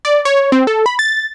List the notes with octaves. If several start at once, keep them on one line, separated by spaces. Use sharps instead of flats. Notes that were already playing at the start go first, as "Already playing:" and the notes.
D5
C#5
C4
A4
B5
A6